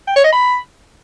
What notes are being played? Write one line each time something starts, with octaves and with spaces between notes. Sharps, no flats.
G5
C#5
D#5
B5